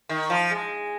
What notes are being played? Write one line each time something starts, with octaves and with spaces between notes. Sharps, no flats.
D#3
F3
G#3